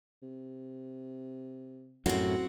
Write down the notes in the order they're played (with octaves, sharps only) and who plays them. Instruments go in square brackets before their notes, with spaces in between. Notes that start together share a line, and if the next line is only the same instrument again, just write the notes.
[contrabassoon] C3
[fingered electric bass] F#2 A2 [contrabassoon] C3 [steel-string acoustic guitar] C4 F#4